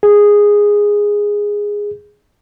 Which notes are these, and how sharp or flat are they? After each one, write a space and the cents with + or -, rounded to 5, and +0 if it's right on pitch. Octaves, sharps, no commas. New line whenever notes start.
G#4 -10